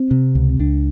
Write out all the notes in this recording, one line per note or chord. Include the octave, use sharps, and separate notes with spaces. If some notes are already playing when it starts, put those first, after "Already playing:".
Already playing: C4
C3
C#2
C#2 D4